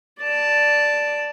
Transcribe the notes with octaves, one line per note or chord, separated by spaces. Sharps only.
D5 A5